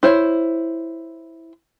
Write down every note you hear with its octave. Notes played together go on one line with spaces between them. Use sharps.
E4 C5 C#5